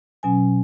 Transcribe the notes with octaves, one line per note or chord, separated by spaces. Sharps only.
B2 F#3 C#4 G#5